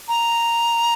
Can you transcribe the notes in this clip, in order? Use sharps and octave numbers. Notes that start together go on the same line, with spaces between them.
A#5